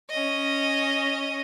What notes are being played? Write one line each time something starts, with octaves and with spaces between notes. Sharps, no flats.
C#4 D#5